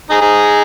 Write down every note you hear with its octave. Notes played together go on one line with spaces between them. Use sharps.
D#4 G#4
D#4 G#4